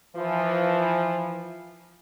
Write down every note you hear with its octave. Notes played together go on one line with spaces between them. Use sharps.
E3 F3